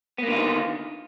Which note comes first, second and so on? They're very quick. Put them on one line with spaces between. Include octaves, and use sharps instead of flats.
B3 A#3 D3 F4 D#3